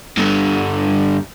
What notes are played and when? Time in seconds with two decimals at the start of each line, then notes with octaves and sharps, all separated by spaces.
0.18 G2 D3